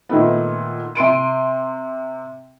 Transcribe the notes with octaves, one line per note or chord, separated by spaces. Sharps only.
A#2 D#3 A3 B3
C3 C6 D7 D#7